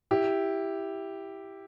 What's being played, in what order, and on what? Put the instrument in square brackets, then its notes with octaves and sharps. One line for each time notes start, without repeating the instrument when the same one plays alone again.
[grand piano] E4 G4